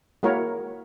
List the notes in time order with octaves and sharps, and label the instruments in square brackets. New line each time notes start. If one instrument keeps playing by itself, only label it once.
[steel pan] G#3 A#3 E4 F#4 A#4 C#5